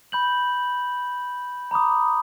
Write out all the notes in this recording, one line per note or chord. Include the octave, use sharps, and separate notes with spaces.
B5 G6 F#7
A#5 B5 D6 D#6